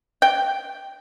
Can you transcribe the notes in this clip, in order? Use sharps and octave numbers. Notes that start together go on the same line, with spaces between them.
G5